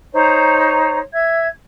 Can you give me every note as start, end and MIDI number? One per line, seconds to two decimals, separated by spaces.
0.13 0.98 63
0.13 0.98 72
0.13 0.98 73
0.13 0.98 82
1.12 1.45 76
1.12 1.45 92